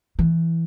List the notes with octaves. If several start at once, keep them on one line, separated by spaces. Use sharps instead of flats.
E3